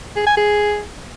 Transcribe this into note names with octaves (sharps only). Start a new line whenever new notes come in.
G#4
G#5
G#4